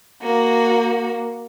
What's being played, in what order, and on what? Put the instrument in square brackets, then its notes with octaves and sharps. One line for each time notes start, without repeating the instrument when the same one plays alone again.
[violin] A#3 F#4